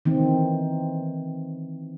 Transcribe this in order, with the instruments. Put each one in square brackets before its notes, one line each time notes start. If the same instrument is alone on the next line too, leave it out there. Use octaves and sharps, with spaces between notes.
[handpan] D#3 E3 C4